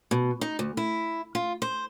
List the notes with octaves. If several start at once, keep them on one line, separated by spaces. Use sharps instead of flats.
B2
D#4
D2
E4
F4
C5